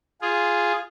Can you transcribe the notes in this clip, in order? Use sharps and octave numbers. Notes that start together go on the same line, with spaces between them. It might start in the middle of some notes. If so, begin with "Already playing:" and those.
F4 G#4